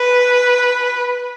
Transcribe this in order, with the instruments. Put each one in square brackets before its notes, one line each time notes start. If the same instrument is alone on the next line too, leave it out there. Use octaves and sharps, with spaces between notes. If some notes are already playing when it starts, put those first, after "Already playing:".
Already playing: [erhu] B4